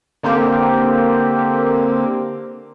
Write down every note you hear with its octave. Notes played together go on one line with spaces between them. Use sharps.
D3 A#3 C4 G4